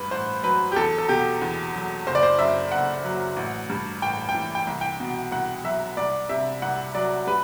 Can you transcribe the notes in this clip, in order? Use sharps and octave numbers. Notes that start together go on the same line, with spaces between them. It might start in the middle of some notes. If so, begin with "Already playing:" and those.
Already playing: A1 G2 B4
A1 C5
F#3 B4
G4
E2 A4
A4
B2 G4
E2
F#3
F#1 C5
D5
C5
F#2 E5
F#1 F#5
F#3
A1
G2
A1 G5
G5
E3
G5
C2
G5
B2
C2 F#5
F#3 E5
C2 D5
C3 E5
C2 F#5
F#3 D5
G3 B4